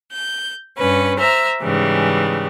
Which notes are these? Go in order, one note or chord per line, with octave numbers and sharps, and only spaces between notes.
G6
G2 C#4 B4
C5 E5 A#5 F6
G#2 C#3 E3 G3